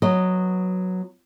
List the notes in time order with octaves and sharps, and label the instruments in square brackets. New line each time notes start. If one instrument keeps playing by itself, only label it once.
[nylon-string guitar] F#3 B3 D#5